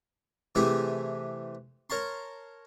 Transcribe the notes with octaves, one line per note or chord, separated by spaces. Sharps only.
C3 E3 A3 E4 G4 G#4
A#4 C#5 A5 C6